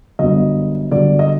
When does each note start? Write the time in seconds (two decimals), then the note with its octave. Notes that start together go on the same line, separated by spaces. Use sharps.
0.19 G1 F#2 D3 D#5
0.91 G1 F#2 D3 D5
1.19 D#5